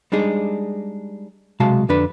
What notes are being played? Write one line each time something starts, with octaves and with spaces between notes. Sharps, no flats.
G3 G#3 D4 D#4 G#4
B1 C3 G#3 F#4 F5 A5
F2 D3 D4 B4